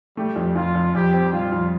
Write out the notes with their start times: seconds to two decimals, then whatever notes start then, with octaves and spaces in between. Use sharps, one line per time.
0.17 G3 A3 G4
0.36 F2
0.56 F2 F4
0.75 F2
0.94 F2 G3 G4
1.14 C4
1.33 G3 F4
1.52 F2